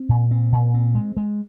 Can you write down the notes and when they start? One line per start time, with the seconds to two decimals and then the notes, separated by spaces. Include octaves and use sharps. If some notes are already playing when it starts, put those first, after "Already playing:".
Already playing: C4
0.09 A#2
0.31 C4
0.52 A#2
0.74 C4
0.95 G#3
1.17 G#3